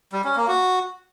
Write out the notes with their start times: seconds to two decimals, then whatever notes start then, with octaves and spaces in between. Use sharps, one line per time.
0.13 G3
0.24 C#4
0.36 A#3
0.48 F#4